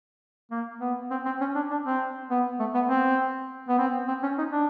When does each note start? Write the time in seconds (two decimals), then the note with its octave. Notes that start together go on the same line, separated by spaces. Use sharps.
0.52 A#3
0.81 B3
1.11 C4
1.25 C4
1.41 C#4
1.55 D4
1.71 D4
1.86 C4
2.30 B3
2.60 A3
2.75 B3
2.89 C4
3.68 B3
3.79 C4
4.08 C4
4.23 C#4
4.38 D#4
4.52 D4